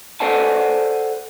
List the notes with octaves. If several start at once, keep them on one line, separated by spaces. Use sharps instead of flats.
A4 C5 D5 F#5 G#5 A5